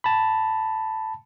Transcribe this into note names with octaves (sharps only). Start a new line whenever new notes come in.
A5 B5